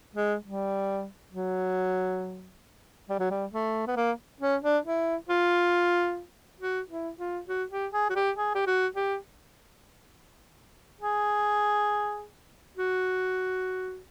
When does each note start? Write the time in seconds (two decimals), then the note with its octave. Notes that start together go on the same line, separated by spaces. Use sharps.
0.15 G#3
0.45 G3
1.32 F#3
3.09 G3
3.19 F#3
3.31 G3
3.53 A3
3.88 B3
3.96 A#3
4.41 C#4
4.63 D4
4.85 E4
5.29 F4
6.60 F#4
6.90 E4
7.19 F4
7.48 F#4
7.71 G4
7.93 G#4
8.10 F#4
8.15 G4
8.37 G#4
8.55 G4
8.67 F#4
8.96 G4
11.01 G#4
12.77 F#4